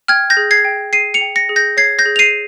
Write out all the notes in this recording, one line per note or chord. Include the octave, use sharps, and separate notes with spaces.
G5 F6 G#6
G6 A#6
G#4
G#6 C7
G5
G#4 C7 D#7
C#7 F7
G5
A#6 C#7
G#4
G6 A#6
C#5 G#6 C7
G6 A#6
G#4
F7
C7 D#7